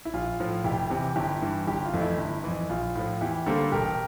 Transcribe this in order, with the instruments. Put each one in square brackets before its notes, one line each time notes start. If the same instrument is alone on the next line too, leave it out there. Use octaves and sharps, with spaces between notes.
[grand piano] E4
A#1 F4
A2 F3
F1 E4 G4
E2 C3
G1 E4 G4
G2 E3
G1 E4 G4
F4
F2 E3 A3
E4
G1
F2 E3
A#1 F4
A2 F3
E2 E4 G4
D3 G3 A#3 A4 C5
E1 G4 A#4